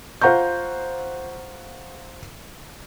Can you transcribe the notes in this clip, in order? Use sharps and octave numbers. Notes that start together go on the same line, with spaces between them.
F4 C5 F#5 A#5 C#6 G6